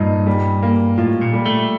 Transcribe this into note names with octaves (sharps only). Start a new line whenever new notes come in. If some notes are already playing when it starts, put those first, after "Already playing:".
Already playing: G2 A#2 D#4
G3
A#3
A2 F4
A#2
G3
A3